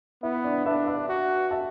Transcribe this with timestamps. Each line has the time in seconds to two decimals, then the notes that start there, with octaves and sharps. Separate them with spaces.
0.23 B3 E4
0.44 D4
0.66 D4 B4 E5
0.87 B4 E5
1.09 F#4
1.51 E5 A5